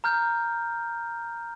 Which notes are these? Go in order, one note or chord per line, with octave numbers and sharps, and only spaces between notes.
A#5 F6 G6